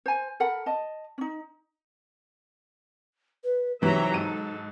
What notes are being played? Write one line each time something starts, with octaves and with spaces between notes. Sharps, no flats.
C5 G#5
A4 A#4 F#5 B5
D#5 A5
C#4 D#4
B4
C3 E3 F#3 D#4 E5 A#5
G#2 A4 D#7